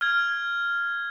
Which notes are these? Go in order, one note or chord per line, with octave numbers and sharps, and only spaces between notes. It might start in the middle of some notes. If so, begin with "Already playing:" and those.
F6 G#6